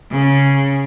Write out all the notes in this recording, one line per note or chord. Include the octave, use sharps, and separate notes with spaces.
C#3